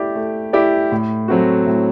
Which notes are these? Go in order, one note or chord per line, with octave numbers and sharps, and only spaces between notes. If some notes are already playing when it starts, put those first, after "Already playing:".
Already playing: A3 E4 G4 D5
A3
E4 G4 D5
A2
F#3 A3 C4 F#4
A2